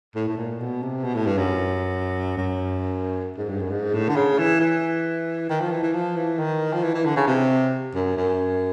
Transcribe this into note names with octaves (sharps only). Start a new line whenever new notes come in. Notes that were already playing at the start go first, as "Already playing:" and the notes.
A2
A2
A#2
B2
C3
B2
A2
G2
F#2
F#2
G#2
G2
F#2
G#2
A2
D3
C#3
E3
E3
D#3
F3
E3
E3
F3
E3
D#3
F3
E3
E3
D3
C#3
C3
F#2
F#2